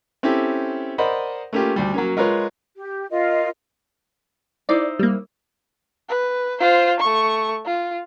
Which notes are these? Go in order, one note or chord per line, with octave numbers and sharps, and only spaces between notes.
C4 C#4 E4 G4 A4
A#4 C5 D5 D#5 F#5 B5
A3 A#3 C#4 F4 G4
D2 G3
F#3 A#3 C#4
G#3 F4 A#4 B4 C#5
G4
F4 A#4 D#5
D#4 E4 C5 D5
G3 A#3
B4
F4 C5
A3 C#6
F4